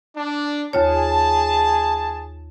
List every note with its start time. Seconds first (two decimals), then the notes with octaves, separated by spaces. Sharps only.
0.17 D4
0.73 D#2 F4 G#4 C#5 A5